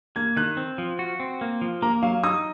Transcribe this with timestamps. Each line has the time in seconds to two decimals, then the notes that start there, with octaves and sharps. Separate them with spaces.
0.16 A#3 G#6
0.37 D#3 F#6
0.57 C4
0.78 F3
0.99 F#4
1.20 C4
1.41 A#3
1.61 F3
1.82 A#3 A#5
2.02 F#3 F5
2.24 D#4 D#6